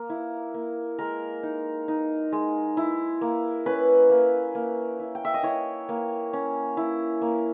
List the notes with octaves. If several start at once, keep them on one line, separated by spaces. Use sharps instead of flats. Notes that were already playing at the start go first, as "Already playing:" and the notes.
Already playing: A#3
E4
A#3
G#3 A#4
D#4
D#4
G#3
E4
A#3
C#4 B4
A#3
A#3
E4
G5
E5
D#5
E4 C#5
A#3
C#4
E4
A#3